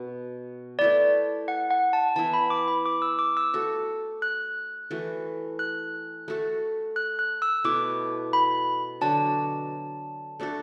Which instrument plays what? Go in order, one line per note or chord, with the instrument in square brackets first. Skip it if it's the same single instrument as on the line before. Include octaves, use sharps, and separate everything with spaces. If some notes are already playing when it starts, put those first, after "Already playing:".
Already playing: [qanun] B2 B3
[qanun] A3 E4 B4 [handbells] D5
[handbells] F#5
F#5
A5
[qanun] E3 B3 E4 [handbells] A5
[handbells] B5
D6
B5
D6
E6
D6
E6
[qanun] A3 F#4 A4
[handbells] F#6
[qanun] E3 A3 F#4
[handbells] F#6
[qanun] A3 F#4 A4
[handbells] F#6
F#6
E6
[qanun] B2 A3 E4 [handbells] D6
[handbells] B5
[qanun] D3 F#3 D4 F#4 [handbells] A5
[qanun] A3 D4 F#4 A4